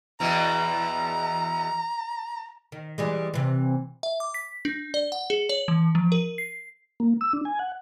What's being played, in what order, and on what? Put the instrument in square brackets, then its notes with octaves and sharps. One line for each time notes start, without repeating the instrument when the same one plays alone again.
[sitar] E2 B2 E3 [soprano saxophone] A#5
[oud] D#3
E3 G3 G#3
C3 E3
[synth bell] E5
D6
B6
D4
D5
F#5
G#4
C#5
E3
F3
A#4
C7
[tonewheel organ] A#3
E6
D4
G#5
F#5